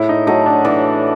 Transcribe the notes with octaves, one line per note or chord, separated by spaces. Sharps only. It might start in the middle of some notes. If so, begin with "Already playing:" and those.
Already playing: A2 E4
D#4
F#3 A3 D#4
D4
E3 D4